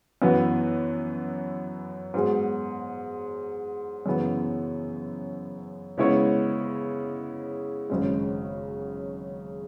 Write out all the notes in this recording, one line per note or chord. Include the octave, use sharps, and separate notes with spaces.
F#2 E3 B3 F#4 B4
G#2 F#3 B3 G#4
F#2 C#3 E3 B3
C#3 G#3 B3 E4 C#5
G#1 F#2 C#3 G#3